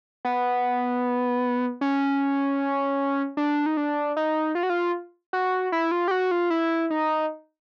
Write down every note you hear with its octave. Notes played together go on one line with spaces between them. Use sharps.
B3
C#4
D4
D#4
D4
D#4
F4
F#4
F4
F#4
E4
F4
G4
F#4
F4
E4
D#4